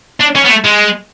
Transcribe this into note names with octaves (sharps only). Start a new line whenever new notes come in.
D4
C#4
B3
A3
G#3